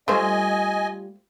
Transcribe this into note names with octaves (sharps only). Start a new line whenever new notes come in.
G3 A3 F4 C5 D#5 G#5